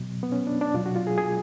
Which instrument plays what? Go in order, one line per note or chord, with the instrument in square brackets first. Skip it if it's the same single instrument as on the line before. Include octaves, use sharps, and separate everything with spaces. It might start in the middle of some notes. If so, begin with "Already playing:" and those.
Already playing: [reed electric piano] B2 F#3
B3
C#4
D4
D4
B2 F4
F#3
F#4
F4
G#4
G#4